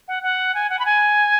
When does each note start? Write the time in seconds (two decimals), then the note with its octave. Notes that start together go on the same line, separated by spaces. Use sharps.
0.08 F#5
0.23 F#5
0.55 G#5
0.70 F#5
0.79 B5
0.85 G#5